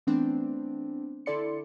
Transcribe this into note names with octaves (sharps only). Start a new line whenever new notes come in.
E3 A3 B3 C4 D4
D3 E4 A4 D5 C6 C#7